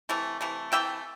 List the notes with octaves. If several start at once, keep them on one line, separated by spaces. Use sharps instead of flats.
C3 E3 A3
C3 E3 A3
C3 E3 A3 E5 G5